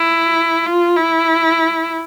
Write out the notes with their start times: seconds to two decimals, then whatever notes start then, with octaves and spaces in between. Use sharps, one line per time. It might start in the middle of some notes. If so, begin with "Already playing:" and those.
Already playing: E4
0.66 F4
0.96 E4